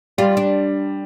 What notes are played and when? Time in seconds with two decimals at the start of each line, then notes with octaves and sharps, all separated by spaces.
0.18 G3 F4
0.37 D4